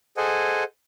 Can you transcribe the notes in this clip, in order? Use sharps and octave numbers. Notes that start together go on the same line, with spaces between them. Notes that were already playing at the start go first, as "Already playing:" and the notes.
G#4 A4 C5 D#5 F#5 G#5